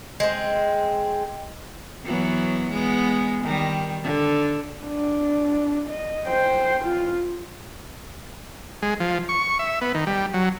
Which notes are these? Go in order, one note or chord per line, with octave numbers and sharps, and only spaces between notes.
G#3 C4
E3 F#3 B3
G#3 B3
D#3 G3
D3
D4
D#5
C5 G5
F4
G#3
F3
C#6
E5
B3
D#3
G3
F#3